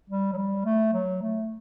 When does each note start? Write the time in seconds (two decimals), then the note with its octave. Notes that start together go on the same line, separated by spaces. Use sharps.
0.10 G3
0.33 F#3
0.37 G3
0.65 A3
0.93 F#3
1.22 A3